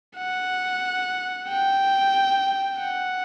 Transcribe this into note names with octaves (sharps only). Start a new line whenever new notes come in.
F#5
G5
F#5